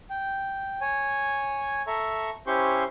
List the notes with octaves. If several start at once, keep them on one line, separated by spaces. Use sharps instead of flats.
G5
C#5 G#5
A4 E5 A#5 C#6
C#4 E4 G4 C5 C6 C#6